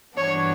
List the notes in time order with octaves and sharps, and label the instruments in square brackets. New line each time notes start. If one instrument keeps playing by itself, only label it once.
[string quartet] G2 E3 B3 D4 F#4 [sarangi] C#5